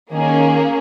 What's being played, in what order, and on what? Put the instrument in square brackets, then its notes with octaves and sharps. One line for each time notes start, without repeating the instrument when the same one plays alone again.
[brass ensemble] D#3 [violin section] A#3 C#4 G#4